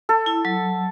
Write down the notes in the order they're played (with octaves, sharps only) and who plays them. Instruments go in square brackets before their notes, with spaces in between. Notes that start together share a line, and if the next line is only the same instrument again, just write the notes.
[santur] A4
[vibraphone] E4
F#3